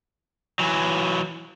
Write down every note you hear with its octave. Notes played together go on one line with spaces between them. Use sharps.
E3 F#3